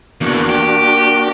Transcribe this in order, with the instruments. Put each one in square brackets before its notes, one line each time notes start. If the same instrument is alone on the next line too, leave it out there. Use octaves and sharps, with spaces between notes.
[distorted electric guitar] E2 [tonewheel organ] A#3 D4 F#4
[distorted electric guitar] G4